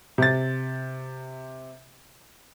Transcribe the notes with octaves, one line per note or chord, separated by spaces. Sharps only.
C3 A6